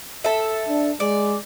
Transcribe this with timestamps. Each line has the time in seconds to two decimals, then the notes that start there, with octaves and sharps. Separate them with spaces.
0.24 A4 E5
0.68 D4
1.00 G#3 D5